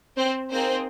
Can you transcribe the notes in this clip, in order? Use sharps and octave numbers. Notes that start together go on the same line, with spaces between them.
C4 C5
A#3 C4 D#4 G#4 C5